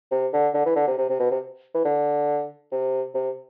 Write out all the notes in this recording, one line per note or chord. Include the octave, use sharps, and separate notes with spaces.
C3
D3
D3
E3
D3
C3
C3
C3
B2
C3
E3
D3
C3
C3